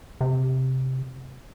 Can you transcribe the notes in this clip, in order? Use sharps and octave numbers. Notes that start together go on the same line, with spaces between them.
C3